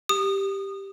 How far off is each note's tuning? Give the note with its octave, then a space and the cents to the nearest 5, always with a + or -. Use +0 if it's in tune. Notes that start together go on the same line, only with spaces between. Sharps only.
G4 +0 D#6 -25